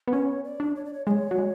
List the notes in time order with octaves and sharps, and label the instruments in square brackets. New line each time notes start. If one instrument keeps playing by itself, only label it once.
[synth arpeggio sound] B3
[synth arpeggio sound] C#4 [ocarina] C#5
[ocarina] D5
[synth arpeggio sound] D4
[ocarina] C#5
D5
C#5
[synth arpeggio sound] G#3 [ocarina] C#5 D5
[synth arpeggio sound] F#3
G#3